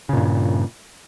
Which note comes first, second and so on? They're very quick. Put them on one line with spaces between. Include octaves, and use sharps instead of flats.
C#3 A#2 G2